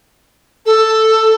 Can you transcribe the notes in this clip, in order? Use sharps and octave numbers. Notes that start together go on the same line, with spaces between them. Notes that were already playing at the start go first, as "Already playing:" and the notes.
A4